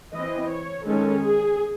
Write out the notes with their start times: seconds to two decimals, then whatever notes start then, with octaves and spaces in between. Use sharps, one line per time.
0.13 E3 D#5
0.19 C4
0.49 C#5
0.86 D#3 G#3 C#4 A4
1.22 G#4